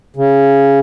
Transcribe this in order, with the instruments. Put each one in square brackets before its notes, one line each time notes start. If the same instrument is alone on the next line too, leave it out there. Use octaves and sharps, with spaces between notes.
[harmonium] C#3